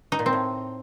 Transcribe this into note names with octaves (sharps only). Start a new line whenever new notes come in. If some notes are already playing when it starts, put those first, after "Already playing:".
D#4
A#2
C4
A2